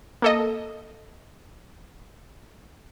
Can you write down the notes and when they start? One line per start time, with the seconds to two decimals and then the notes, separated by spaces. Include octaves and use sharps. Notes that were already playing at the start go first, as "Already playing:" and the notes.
0.22 A#3 A4 D#5